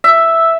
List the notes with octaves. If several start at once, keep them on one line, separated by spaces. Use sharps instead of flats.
E5